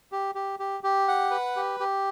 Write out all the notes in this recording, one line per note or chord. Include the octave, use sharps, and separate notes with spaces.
G4
G4
G4
G4
F#5
B4
G4
G4